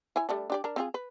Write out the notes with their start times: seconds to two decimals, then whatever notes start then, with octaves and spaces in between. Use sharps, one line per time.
0.16 E4 C#5 G#5
0.29 G3 A3 D4
0.50 D4 G4 D5
0.64 D4 A#4
0.76 C4 F4 G#4
0.94 B4